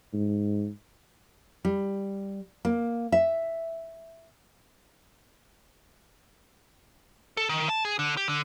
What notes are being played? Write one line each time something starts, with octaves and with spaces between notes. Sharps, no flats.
G#2
G3
A#3
E5
A4
D#3
A5
G#4
D3
G4
D3